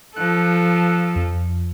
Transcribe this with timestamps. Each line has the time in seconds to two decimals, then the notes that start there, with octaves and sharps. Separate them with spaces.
0.16 F3 A4 F#6
1.15 F2